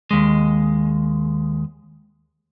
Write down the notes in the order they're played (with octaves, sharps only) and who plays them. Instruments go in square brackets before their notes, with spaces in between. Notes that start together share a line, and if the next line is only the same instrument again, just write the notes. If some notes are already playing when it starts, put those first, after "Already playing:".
[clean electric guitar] D#2 G#3